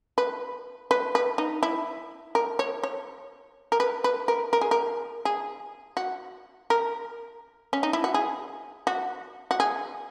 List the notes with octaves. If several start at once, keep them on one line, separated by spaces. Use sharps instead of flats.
B4
B4
B4
D#4
E4
A#4
C#5
C#5
A#4
B4
B4
A#4
A#4
G#4
A#4
G#4
F#4
A#4
C#4
D#4
E4
F#4
G#4
F#4
F#4
G#4